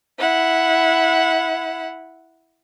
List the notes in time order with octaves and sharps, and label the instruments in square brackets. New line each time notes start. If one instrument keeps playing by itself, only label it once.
[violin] E4 F#5